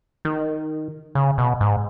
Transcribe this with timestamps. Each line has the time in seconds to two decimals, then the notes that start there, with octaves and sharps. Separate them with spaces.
0.25 D#3
1.15 C#3
1.38 B2
1.61 G#2